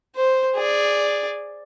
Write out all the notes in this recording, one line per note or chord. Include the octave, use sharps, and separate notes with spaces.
C5
G#4 D5